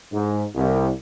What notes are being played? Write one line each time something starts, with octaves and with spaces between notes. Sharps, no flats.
G#2
C2